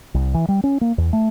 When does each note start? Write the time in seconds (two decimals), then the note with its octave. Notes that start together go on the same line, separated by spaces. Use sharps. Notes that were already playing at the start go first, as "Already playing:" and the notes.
0.14 C2
0.34 E3
0.48 G3
0.64 C#4
0.81 A#3
0.98 E2
1.13 A3